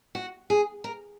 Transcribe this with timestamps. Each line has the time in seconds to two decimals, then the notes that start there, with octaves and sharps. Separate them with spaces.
0.15 F#4
0.50 G#4
0.84 A#4